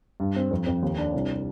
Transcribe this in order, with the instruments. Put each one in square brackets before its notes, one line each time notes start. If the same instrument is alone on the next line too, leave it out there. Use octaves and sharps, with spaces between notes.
[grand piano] G2
C4
F2
F2
D#2
D4
C2